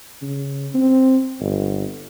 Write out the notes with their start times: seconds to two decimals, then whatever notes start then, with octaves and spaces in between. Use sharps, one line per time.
0.22 C#3
0.74 C4
1.40 G1